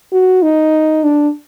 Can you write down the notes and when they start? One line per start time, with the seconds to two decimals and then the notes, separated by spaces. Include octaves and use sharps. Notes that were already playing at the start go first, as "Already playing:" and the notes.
0.12 F#4
0.42 D#4
1.04 D4